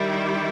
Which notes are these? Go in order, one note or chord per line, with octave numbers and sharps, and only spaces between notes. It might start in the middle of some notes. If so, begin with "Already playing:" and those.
Already playing: D#3 G3 E4